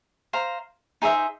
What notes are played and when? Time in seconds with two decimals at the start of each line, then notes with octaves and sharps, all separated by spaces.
0.33 C5 F5 A#5
1.02 D#4 G#4 C5 E5